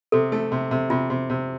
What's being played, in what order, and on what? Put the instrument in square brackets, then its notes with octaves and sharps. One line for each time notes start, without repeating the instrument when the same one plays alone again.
[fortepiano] C3 [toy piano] A4
[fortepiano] A3
C3
C3
[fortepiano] C3 [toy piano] F4
[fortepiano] C3
C3